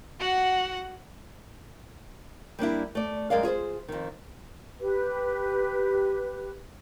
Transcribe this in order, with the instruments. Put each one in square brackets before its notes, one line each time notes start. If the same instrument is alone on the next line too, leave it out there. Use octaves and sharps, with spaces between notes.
[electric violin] F#4 F#5
[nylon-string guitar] G3 A#3 D4 E4
A3 D5
F#2 G#3 A#4 D5 F5
F4 G#4 B4 C5
F2 D#3
[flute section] G4 B4